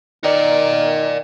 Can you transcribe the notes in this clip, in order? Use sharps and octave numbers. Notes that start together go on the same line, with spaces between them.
D#3 A#4 D5